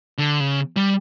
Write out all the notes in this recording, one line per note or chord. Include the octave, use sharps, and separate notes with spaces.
D3
C#3
G3